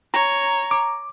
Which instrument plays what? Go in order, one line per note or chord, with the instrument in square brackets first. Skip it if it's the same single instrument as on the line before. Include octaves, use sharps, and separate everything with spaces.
[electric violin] C#5 [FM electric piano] A#5
[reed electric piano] D6